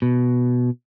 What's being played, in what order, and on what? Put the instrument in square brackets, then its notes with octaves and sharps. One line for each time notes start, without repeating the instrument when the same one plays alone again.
[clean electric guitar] B2